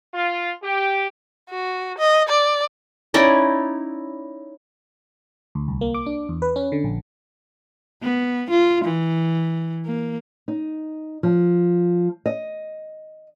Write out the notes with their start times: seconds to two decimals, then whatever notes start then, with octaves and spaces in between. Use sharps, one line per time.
0.13 F4
0.62 G4
1.50 F#4
1.98 D#5
2.29 D5
3.14 C#4 D#4 E4 D5
5.55 D2
5.68 C2
5.81 A#3
5.94 D6
6.06 D4
6.29 E2
6.42 B4
6.56 C#4
6.72 D3
6.84 A#1
8.03 B3
8.50 F4
8.85 E3
9.86 A#3
10.48 D#4
11.23 F3
12.26 D#5